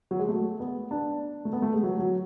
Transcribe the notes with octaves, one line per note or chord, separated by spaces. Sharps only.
F#3
G#3
A3
B3
D4
A3
B3
A3
G#3
F#3
F#3